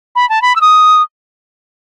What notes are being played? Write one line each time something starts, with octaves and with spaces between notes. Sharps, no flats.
B5
A5
B5
E6
D#6